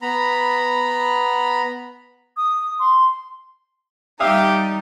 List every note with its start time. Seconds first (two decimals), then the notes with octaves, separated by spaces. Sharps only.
0.02 B3 A#5 B5
2.37 D#6
2.79 C6
4.20 G3 D#4 G4 E5 F5 D#6